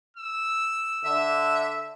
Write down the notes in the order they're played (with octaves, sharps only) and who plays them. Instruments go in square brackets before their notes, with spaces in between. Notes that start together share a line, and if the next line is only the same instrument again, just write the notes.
[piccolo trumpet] E6
[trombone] D3 [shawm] E5